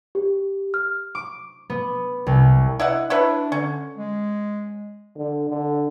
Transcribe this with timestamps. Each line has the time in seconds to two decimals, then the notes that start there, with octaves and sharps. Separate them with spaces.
0.15 G4
0.74 F6
1.15 D6
1.70 B3
2.27 C2
2.80 E4 D#5 F#5
3.10 D4 E4 B4 C#5
3.52 D3 C#4
3.97 G#3
5.17 D3
5.49 D3